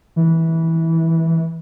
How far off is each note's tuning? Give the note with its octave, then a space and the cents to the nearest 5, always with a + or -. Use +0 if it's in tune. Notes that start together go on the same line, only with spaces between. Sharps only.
E3 -15